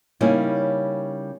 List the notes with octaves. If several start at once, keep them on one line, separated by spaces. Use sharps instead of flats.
C#3 G3 A#3 C#4 D#4 E4